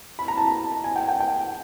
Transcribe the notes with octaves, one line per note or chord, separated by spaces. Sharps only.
B5
A#5
A5
G#5
G5
G5
G5